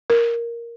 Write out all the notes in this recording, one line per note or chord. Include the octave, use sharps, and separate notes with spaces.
A#4